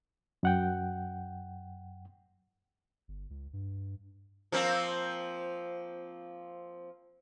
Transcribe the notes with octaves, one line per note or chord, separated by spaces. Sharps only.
F#2 F#5 G5
G1
C#2
G2
F3 A#3 C4